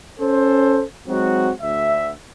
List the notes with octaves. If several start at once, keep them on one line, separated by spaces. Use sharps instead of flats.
C#4 A4 C5
F#3 G#3 C4 D#4 F#4
D2 E5